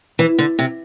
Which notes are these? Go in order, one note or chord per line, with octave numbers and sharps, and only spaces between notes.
E3
D3
C3